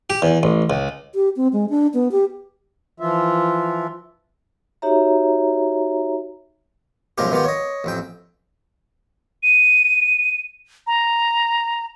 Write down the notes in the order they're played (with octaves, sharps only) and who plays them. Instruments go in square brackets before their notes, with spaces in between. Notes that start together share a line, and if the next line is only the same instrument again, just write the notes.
[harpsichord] G4
E2
A1
C#2
[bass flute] G4
C4
G#3
D4
B3
G4
[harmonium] E3 F3 F4 E5
[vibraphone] D#4 F#4 G4 C#5 E5 A#5
[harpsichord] B1 F#2 F3 G#3 F4 G4
D#3 B3 F4 G4
C#5 D#5
A1 F2 G5
[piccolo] D#7
A#5